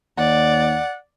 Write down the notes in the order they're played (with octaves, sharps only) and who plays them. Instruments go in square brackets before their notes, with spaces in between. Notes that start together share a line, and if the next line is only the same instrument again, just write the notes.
[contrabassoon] D#2 [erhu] D5 [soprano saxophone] F#5